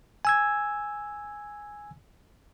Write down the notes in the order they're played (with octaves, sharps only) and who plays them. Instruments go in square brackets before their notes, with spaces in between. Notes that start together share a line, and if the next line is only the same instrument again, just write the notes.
[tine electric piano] G#5 E6 G#6